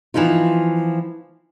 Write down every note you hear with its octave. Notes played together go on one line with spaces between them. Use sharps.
E3 F3 B3 D#4 F4